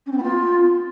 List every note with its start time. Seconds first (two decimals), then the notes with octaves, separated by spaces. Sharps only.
0.06 C#4
0.12 C4
0.17 B3
0.23 F4